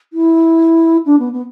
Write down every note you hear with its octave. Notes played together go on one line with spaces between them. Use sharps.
E4
D4
B3
B3